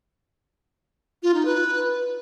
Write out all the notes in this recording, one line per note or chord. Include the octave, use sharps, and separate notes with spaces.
F4
D#4
B4